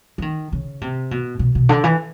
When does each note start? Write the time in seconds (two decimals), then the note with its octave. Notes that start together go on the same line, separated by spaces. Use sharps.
0.18 E3
0.22 D#3
0.52 C#3
0.81 C3
1.11 B2
1.39 B2
1.55 B2
1.69 D3
1.84 E3